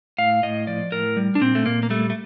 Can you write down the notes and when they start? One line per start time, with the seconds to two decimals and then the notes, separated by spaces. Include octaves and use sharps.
0.18 A2 F5
0.43 A2 D#5
0.67 F3 D5
0.92 A2 A#4
1.17 G3
1.35 D4
1.41 A#2 C4
1.55 A3
1.66 A#2 A#3
1.83 A#3
1.90 G3 A3
2.10 A3